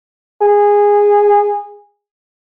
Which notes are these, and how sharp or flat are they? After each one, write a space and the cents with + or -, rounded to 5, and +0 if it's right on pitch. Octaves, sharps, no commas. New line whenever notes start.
G#4 -15